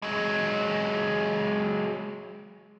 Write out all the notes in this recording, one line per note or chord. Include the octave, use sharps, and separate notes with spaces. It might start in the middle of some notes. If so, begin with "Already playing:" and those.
F#3 G#3